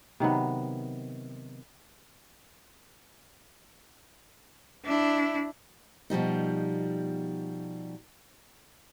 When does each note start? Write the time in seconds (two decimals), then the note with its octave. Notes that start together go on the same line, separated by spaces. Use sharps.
0.20 C3 D#3 F#3 B3
4.85 D4 E4
6.10 B2 F3 G3 D#4